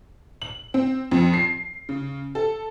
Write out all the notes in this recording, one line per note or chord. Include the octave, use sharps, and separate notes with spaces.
F#7
C4
F2
C7
C#3
A4